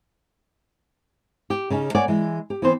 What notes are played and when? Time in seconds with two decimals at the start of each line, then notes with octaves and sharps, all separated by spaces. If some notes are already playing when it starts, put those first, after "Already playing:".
1.50 G4
1.70 C#3 C#4 D#4
1.95 A#3 C#5 D5 F#5 G#5
2.08 E3 G#3
2.50 G4
2.62 E3 B3 C4 B4 C5